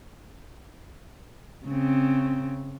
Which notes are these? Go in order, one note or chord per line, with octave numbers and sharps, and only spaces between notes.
C#3 C4